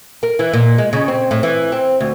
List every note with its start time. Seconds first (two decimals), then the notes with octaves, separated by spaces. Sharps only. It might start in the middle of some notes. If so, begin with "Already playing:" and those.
0.23 A#4
0.39 E3
0.53 A#2
0.78 G#3
0.93 C#3
1.08 C4
1.31 A2
1.43 E3
1.72 C4
2.01 D2